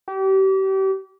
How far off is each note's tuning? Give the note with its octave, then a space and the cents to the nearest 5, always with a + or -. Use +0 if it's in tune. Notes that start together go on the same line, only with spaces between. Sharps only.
G4 -35